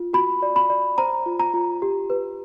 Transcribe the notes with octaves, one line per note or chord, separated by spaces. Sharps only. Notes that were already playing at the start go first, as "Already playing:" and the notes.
Already playing: F4
F#4 B5
D5
B5
D5
C5 A#5
F4
A#5
F4
G4
B4